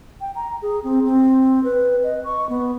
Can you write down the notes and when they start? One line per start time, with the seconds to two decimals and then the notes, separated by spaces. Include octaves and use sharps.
0.21 G5
0.35 A#5
0.62 G#4
0.84 C4
1.05 C4
1.64 B4
2.04 D#5
2.24 C#6
2.49 B3